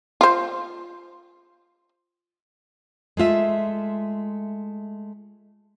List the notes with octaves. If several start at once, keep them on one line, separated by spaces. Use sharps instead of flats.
F4 C5
G#3 A3 F4 E5